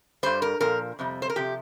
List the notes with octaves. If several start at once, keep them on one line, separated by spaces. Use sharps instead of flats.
G2 G3 C5
A#4
A#2 F3 A#4
F2 C3 G3
C5
A#4
C3 F3 G4